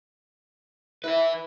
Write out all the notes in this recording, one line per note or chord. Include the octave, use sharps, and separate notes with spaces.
E4 B4 E5